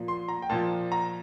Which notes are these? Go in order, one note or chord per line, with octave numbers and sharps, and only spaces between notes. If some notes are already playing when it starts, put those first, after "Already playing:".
Already playing: A#2 F3
C6
A#5
G5
A#2 F3 A5
A#5